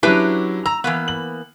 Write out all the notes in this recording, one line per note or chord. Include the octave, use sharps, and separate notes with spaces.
F#3 C#4 D4 E4 G4 B4
A#5 E6
E3 A#3 B3
F#7